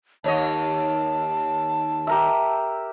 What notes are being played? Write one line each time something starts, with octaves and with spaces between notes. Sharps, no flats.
D#2 C#5 D#5 A5
G4 A#4 E5